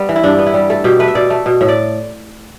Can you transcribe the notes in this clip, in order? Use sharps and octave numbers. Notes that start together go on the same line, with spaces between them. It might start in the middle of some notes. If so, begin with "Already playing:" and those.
Already playing: G3 B3
E3
E4
G2 D4
B3
E4
G3
A3 A4
B2 G4
A3 B4
E5
B2 D5
A3
B2
A2 E5
D5